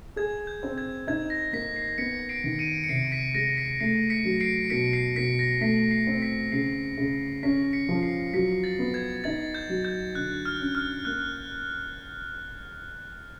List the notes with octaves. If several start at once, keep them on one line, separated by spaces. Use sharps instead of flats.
G#4 G#6
G6
C4
G#6
D#4 G#6
A#6
A#3 B6
C7
B3 B6 C#7
C7 D7
D#3
C#7 D#7
C#7
C3 C7 D7
B6
G#3 A#6
B6
A3 C7
B6 C#7
F#3
C7 D7
B2 B6 C#7
C7
B2 B6
A#6
A3 B6
C7
C4
B6
C#3 C7
C#3
C#4 B6
B6 C#7
F3
C7
F#3 B6
A6
B3
G#6
D#4 A6
G6
F#3
G6
D3 F#6
F6
C#4
F6
A#3 F#6